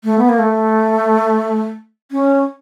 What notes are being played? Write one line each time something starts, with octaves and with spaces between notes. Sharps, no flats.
A3
B3
A#3
A3
C#4